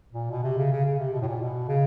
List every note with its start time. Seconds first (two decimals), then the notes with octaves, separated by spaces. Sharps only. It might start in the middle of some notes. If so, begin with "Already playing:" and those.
0.12 A#2
0.31 B2
0.44 C3
0.57 C#3
0.72 C#3
0.85 C#3
0.99 C3
1.13 B2
1.22 A2
1.28 A#2
1.40 B2
1.68 C#3